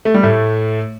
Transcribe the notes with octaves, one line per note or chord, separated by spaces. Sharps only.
A3
G3
A2 A3